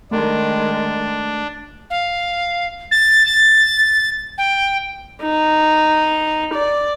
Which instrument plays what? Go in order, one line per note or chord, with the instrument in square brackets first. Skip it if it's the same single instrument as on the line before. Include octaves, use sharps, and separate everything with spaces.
[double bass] D#3 G#3 [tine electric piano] A3 [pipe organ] D4
[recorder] F5
A6
A6
G5
[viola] D#4
D5